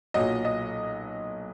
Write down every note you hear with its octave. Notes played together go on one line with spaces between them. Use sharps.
B1 A#2 F#3 D#5
D#5